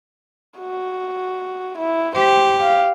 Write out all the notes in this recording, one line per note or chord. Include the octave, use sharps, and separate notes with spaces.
F#4
E4
G4 C5
F5